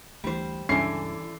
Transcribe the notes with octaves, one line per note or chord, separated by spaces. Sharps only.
D2 E3 G3 C5
C#2 G2 D3 E3 C#4 C7